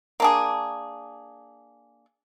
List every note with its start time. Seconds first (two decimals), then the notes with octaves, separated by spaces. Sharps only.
0.20 A#3 D4 G#4